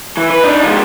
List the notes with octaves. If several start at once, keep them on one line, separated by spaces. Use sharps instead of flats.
E3
B4
D4 D#4
F3 G#3